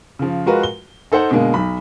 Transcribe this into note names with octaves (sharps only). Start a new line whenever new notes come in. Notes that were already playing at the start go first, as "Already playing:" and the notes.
C#3 F3
G#3 F4 F#4 A#4 B4
G7
D#4 A4 C5 F#5
B2 D3 G#3 A#3
B1 B5